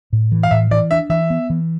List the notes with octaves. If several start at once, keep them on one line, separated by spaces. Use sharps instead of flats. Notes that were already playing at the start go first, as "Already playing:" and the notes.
A2
E3
F5
A2 E5
E3 D5
D4 E5
E3 E5
B3
E3